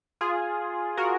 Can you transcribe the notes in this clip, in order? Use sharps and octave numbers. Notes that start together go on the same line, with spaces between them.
F4 G#4
F#4 A#4